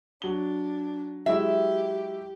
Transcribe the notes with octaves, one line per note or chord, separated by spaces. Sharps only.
F#3 D4 G7
F#3 G#3 E4 G4 E5